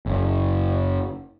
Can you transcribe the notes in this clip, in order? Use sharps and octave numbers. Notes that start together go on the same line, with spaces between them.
F#1